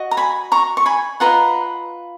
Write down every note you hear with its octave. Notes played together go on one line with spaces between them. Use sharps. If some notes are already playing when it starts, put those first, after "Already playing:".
Already playing: F#4 D#5
A#5
G#5 B5
A#5 C#6
C#6
G#5 B5
F4 B4 D#5 F#5 A#5